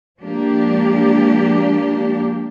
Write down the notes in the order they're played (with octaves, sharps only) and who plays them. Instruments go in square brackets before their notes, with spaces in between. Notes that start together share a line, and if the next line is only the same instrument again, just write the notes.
[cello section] F3 G#3 A#3 D4 G4